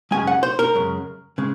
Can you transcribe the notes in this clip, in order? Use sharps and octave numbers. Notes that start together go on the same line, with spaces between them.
F#2 C#3 G#3 G#5
F#5
C5
A#4
F#2 C#3 G#3
C#3 G#3